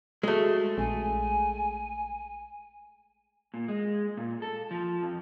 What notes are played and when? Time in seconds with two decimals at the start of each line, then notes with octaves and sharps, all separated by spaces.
0.23 G#3 A3 F#4
0.78 A#1 G#5
3.54 A#2
3.68 G#3
4.17 A#2
4.42 A4
4.71 F3
5.03 F2